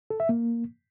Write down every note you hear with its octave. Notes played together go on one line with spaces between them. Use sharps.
A4
E5
A#3